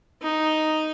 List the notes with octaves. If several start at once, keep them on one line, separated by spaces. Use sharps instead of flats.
D#4